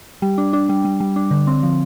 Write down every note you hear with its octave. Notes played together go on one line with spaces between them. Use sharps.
G3
D4
D4
G3
G3
G3
D4
D3
C4
F3